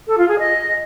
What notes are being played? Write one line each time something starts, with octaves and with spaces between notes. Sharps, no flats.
A4
F4
G#4
D#5